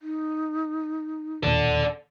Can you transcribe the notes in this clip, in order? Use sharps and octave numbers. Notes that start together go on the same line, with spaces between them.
D#4
E1 D#2 A#2 A4 D5